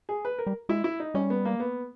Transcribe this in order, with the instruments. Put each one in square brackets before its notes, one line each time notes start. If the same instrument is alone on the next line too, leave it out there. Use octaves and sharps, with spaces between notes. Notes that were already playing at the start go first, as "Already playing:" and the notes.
[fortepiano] G#4
B4
A#4
[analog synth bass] G3
[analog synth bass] G#3 [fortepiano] E4
[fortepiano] E4
D#4
[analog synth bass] G3 [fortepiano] C#4
[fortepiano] B3
A#3
B3